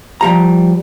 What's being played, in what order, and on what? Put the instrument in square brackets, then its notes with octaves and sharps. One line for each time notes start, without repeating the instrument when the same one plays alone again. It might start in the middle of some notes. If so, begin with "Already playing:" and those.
[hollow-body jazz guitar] F3 G3 A#5